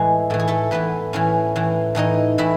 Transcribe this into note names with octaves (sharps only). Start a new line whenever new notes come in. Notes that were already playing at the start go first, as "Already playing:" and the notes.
Already playing: A2 E3 G#3 G#4
A2 E3 A4
G#4
A3 A4
A2 E3 B3 B4
A2 E3 C#4 C#5
A2 E3
A2 E3 D#4 D#5
A2 E3 E4 E5